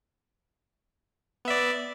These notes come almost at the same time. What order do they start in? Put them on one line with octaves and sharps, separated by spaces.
B3 E5 D5